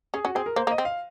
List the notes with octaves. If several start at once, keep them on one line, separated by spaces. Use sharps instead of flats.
C#4 G#4
C#4 F#4
C4 G#4
A#4
A#3 C5
A#3
D#5
C4
F5